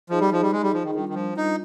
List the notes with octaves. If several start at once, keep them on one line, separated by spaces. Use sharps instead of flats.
F3 D#4 G#4 D#5
G3
F3
G3
G#3
G3
F3
D#3
D#3 G3 D4 F4 A#4
D#3
F3
D#4